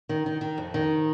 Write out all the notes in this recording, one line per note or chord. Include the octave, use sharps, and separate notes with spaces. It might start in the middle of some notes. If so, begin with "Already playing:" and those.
D#3
D#3
D#3
F2
D#3